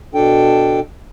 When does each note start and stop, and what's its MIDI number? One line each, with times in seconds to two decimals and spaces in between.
0.14 0.80 47
0.14 0.80 62
0.14 0.80 69
0.14 0.80 79